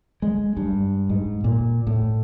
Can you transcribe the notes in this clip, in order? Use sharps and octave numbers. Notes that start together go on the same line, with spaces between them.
G#3
G2
G#2
A#2
A2